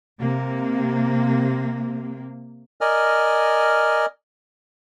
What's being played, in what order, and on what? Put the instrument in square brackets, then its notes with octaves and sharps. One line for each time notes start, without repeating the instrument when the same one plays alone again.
[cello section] C3 A#3
[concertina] A#4 D5 D#5 G#5 F6